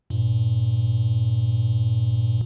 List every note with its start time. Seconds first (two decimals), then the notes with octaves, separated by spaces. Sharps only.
0.10 G2 A#2